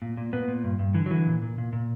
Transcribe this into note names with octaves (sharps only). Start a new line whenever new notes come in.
A#2
A#2
A#2 B3
A#2
G2
G2
D3 E3
F#3
D3 E3
A#2
A#2
A#2
A#2